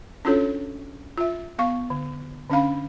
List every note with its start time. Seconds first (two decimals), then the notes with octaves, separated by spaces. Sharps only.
0.25 C#4 D4 F4 F#4 A4 C#5
1.18 F4 E5
1.58 B3 F5 C#6
1.90 D3
2.50 D3 C#4 D4 F5 B5